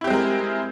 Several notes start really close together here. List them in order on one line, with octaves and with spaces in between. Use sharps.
E4 G4 C4 G#3 A#4